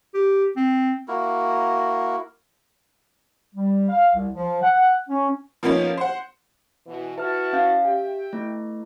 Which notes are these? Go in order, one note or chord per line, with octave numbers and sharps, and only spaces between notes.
G4
C4
A#3 E4 F#4 A#4
G3
F5
C2
F3
F#5
C#4
F3 A#3 B3 C#4 D#4
C5 F#5
B2 E3
E4 F#4 B4 E5 A5 F6
C#4 F5 G6
G4 E5 G5
A3 B3 E4